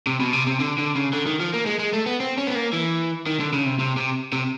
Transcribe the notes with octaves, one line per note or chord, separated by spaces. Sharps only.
C3
B2
C3
C3
D3
D3
C#3
D3
D#3
F3
A#3
G#3
G#3
A3
B3
C4
C#4
B3
A#3
E3
D#3
D3
C#3
C3
C3
C3
C3